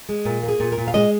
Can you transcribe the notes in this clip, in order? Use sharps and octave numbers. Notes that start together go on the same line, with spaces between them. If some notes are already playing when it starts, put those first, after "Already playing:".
G#3
A#2 A#4
A#3
G#4
A#2
A#4
A#2
F5
G#3 D#5